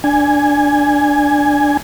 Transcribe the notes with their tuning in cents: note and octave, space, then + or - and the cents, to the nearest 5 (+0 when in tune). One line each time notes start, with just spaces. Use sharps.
D4 +0 G#5 +0